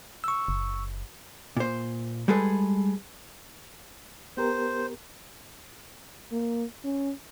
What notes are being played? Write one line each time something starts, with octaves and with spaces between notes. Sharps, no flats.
C#6 E6
F#1
A#2 C5
G3 G#3 G#4 A4 B4
B3 G4 A#4 C5
A#3
C#4